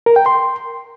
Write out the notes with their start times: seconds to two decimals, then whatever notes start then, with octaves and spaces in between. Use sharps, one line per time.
0.06 A#4
0.16 G5
0.26 C6